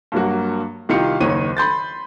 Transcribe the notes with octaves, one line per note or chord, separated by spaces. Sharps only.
G2 F#3 A#3 F#4
C2 D#3 F4 G4 F5 C#7
F#1 D#2 D#3 C#5 D#7
B5 C6 G6 A6